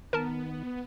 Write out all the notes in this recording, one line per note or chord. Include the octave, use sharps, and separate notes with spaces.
D#3 B3 A#4 A5